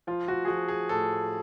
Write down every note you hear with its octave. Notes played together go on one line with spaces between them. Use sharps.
F3 F4
F#4
G#4
F3 F#4
G#4
A2 A4